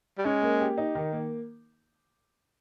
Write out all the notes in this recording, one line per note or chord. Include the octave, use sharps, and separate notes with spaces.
G3
G#3 C#4
A#3
G4
D#4
D#3
A#3